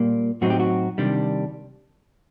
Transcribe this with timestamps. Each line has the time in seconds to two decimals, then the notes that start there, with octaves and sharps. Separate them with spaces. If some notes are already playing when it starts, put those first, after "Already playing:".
Already playing: A#2 G3 A#3
0.41 A2 F#3 C4 D#4 F#4
0.50 G4
0.60 F#4
0.98 C3 D#3 G3 D4